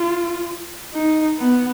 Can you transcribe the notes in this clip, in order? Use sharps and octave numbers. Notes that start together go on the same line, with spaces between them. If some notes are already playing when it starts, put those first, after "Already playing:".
Already playing: F4
D#4
B3